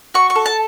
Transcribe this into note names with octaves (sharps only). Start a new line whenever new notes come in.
F#4 C#6
C#6
A4
A5